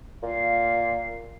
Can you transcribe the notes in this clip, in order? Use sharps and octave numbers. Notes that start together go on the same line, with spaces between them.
A#2 F5